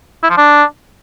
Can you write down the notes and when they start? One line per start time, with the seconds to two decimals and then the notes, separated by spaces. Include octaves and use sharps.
0.23 E4
0.30 F3
0.37 D4